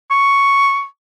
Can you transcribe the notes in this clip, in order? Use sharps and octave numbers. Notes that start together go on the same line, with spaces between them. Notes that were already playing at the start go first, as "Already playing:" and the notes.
C#6